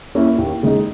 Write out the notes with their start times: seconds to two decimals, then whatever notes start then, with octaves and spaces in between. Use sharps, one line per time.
0.15 A#3 C#4 E4
0.38 D#2
0.63 C#3 G#3 D#4